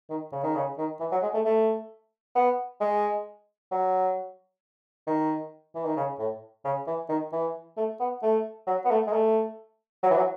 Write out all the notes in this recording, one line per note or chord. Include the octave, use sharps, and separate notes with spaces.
D#3
C#3
D#3
C#3
D#3
E3
F#3
G#3
A3
A3
B3
G#3
F#3
D#3
E3
D#3
C#3
A2
C#3
E3
D#3
E3
A3
B3
A3
F#3
B3
A3
G#3
A3
F#3
E3
F#3